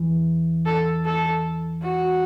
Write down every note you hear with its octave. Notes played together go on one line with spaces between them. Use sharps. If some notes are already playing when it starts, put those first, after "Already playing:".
Already playing: E2 E3
A4
A4
F#4